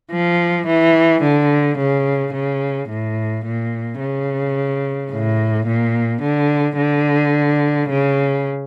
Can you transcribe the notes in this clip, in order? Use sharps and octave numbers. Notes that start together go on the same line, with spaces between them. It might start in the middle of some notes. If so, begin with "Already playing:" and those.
F3
E3
D3
C#3
C#3
A2
A#2
C#3
A2
A#2
D3
D3
C#3